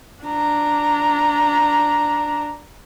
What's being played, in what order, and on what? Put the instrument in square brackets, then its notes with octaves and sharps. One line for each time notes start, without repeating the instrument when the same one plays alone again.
[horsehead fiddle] D4 A#5